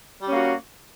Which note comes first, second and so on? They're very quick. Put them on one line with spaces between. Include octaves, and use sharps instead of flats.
G3 C#4 A#3 F#4